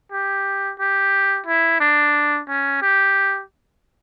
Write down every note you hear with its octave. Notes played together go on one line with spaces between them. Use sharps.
G4
G4
E4
D4
C#4
G4